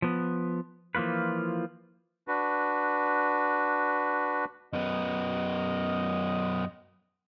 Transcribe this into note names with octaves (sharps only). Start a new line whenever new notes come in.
F3 B3
E3 F3 A#3 F4 B4
D4 F#4 B4
F#2 B3 D#5